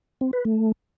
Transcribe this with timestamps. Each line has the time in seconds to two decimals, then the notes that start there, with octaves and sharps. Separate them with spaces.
0.21 C4
0.33 B4
0.45 A3